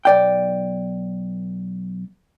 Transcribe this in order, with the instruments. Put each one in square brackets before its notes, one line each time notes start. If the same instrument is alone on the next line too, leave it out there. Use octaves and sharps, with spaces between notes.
[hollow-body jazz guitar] B1 D5 G5